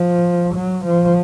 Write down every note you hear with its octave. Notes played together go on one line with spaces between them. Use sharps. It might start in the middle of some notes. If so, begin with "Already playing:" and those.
Already playing: F3
F#3
F3